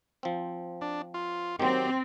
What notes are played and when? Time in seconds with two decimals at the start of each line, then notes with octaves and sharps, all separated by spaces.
0.23 F3 C4
0.81 D4
1.14 F4
1.60 D#3 F#3 C4 G4